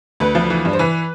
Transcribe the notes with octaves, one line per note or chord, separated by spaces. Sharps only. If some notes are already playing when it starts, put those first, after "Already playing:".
D2 B4
F3
E3
G2
C5
E3 B4